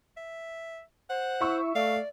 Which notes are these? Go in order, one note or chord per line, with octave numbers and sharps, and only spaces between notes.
E5
C5 F#5
E4 E5 C#6 E6
A3 D5 F5